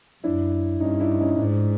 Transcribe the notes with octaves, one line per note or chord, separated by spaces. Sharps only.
F#2 D4 E4
G2 C#4 D#4
D4 E4
C#4 D#4
G#2 D4